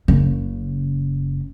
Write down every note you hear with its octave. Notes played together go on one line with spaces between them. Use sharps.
F#1 C#3